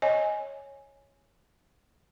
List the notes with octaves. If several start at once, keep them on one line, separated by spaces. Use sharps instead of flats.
C#5 D#5 G#5